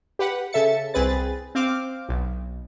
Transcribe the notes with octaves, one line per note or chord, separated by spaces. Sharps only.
G4 B4 F#5
C#3 A4 E5 A6 C#7
C2 C4 G#4 B4 A6
C4 F5 D6
B1